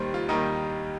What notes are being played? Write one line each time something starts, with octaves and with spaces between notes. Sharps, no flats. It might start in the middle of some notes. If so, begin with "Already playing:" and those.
Already playing: D#2 D#3 G3 C5
F4
D#2 D#3 G3 D#4